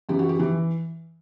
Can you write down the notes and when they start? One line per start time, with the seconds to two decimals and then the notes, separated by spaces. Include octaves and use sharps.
0.09 F#2 E3 G4
0.19 F#4
0.29 G4
0.39 E3